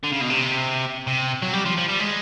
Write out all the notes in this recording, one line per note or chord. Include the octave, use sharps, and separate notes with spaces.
D3
C#3
B2
C3
C3
F#3
G3
F3
F3
G3
G#3